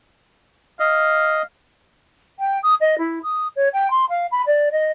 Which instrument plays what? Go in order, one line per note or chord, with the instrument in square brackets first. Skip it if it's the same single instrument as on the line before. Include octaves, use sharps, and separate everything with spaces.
[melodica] D#5 [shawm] F5
[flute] G5
D#6
D#5
E4
D#6
C#5
G5
C6
F5
B5
D5
D#5